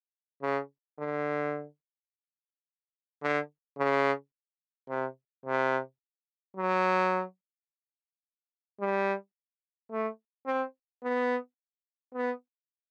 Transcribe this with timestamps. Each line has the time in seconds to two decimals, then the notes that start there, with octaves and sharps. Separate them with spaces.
0.42 C#3
0.99 D3
3.23 D3
3.78 C#3
4.89 C3
5.46 C3
6.57 F#3
8.80 G3
9.91 A3
10.47 C4
11.03 B3
12.14 B3